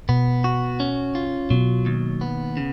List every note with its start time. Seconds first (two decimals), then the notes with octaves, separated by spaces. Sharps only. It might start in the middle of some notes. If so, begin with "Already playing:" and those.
0.09 B2 B3
0.44 F#4
0.80 C#4
1.15 F4
1.50 B2 F#3
1.86 D#2
2.21 B3
2.57 C#3